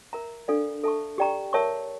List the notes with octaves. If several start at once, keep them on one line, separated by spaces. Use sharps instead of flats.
A#4 E5 A#5
D4 A4 D5 F5
A4 E5 A5 C#6
G4 D5 G5 A#5 C#6
A#4 C#5 E5 A5 C#6